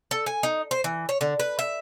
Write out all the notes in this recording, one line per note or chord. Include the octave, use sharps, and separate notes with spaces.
A4
G#5
D#4
C5
E3
C#5
D3
B4
E5